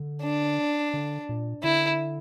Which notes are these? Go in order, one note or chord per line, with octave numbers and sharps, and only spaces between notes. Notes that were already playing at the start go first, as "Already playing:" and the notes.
Already playing: D3
D4
D3
A#2
D3 E4